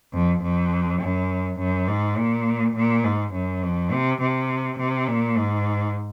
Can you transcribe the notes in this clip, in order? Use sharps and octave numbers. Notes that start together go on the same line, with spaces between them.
F2
F2
F#2
F#2
G#2
A#2
A#2
G#2
F#2
F2
C3
C3
C3
A#2
G#2